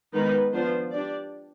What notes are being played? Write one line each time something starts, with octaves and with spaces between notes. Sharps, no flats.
D#3 G#3 B3 D#4 B4
F3 B3 D4 F4 C5
D4 G4 D5